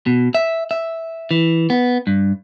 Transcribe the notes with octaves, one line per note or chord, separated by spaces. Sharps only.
B2
E5
E5
E3
B3
G2